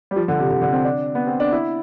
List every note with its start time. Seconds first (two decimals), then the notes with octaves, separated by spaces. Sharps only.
0.11 G3
0.16 F3
0.28 D3
0.39 C3
0.50 D3
0.62 D3
0.73 C4
0.85 D4
1.15 B3
1.27 C4
1.40 D4
1.52 E4